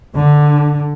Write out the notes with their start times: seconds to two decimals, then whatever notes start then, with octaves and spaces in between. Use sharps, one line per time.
0.17 D3